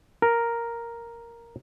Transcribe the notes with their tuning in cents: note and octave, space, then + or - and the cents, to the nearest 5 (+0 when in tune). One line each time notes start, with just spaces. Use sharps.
A#4 +0